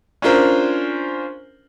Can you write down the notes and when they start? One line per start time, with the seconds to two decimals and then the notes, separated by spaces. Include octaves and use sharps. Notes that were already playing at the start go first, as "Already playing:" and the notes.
0.22 C#4 D4 F4 A#4 C5